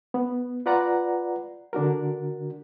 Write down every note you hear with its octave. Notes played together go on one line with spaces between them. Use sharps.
B3
F4 B4 D5 F#5 A#5
D3 D4 F#4 A#4